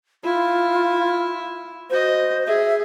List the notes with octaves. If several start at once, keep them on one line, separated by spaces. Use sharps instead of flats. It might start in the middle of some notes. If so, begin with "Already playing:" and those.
E4 F4
F#4 C5 D#5
G#4 E5